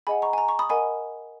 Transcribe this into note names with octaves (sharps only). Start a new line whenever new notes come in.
G#4 D#5 F#5 G#5 B5
A#5 C#6
G#5
A#5
A#5 C#6
B5 D#6
A#4 D#5 F#5 G#5 B5